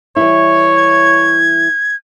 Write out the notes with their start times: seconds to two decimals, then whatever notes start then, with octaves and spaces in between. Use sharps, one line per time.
0.16 E3 G3 E4 C#5
0.77 G#6